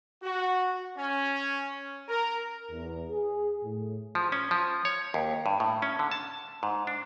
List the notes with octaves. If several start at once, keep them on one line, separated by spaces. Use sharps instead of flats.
F#4
C#4
A#4
E2
G#4
A2
F3
C#4
F3
C#5
D#2
G2
A2
C#4
D3
A5
G#2
D4